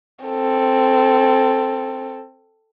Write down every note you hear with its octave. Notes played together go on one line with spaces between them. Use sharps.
C4 A4